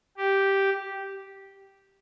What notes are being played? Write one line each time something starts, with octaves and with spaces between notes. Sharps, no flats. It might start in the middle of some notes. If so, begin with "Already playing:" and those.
G4